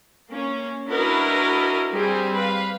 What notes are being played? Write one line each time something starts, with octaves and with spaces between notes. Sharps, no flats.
A#3 C#4
D4 E4 F#4 A#4 B4 D#5
G3 C4 G4 G#4
B4 F5